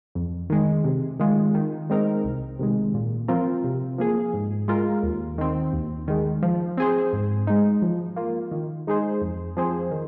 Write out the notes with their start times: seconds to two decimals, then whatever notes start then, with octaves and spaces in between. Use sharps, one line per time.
0.15 F2
0.50 D#3 G#3
0.85 C3
1.19 D#3 G#3 F4
1.55 D#3
1.90 G#3 C4 D#4 A#4
2.24 C2
2.59 C3 D#3 G#3
2.94 A#2
3.28 F3 C4 F4 A#4
3.64 C3
3.98 F3 A#3 G#4
4.33 G#2
4.68 G#3 F4 A#4
5.03 D#2
5.38 D#3 C4
5.73 D#2
6.08 D#3 G#3
6.43 F3
6.78 C4 G#4 C5
7.13 G#2
7.47 G#3 D#4
7.82 F3
8.16 A#3 F4
8.51 D#3
8.87 G#3 D#4 G#4 C5
9.21 F2
9.57 F3 C4 G#4 C5
9.91 D#3